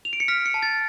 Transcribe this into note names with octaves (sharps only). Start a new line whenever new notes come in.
F7
D7
C#7
F6 B6
C#7
A5
A6